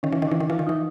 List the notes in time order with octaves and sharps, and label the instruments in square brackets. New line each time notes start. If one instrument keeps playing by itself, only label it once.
[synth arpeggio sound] D#3 [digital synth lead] C#4
[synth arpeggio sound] E3
D#3
[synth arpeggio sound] E3 [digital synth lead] D4
[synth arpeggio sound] D#3
[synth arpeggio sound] E3 [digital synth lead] F4
[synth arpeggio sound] D#3
[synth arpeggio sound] E3 [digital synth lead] D#4